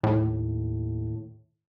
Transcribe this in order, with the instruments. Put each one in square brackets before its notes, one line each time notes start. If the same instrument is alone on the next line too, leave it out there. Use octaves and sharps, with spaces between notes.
[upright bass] D#2 [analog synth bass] A2